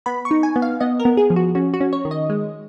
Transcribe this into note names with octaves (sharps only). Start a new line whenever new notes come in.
B3 B5
C#6
D#4
G#5
B3
F5
B3 D#5
A#4
B3
G#4
F3
F#4
C#4 F#4
F#4
C#4
C#5
D#3
D#5
G#3